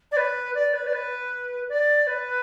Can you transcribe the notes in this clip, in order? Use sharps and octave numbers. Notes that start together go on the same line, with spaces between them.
D5
B4
D5
B4
D5
B4
D5
B4